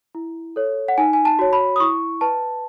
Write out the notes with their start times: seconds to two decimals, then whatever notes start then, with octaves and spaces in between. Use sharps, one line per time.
0.15 E4
0.56 A4 C#5
0.88 F#5
0.98 D#4 G#5
1.13 G#5
1.25 A5
1.39 F#4 C#5
1.53 B5
1.76 D#6
1.80 E4 C#6
2.21 B4 A5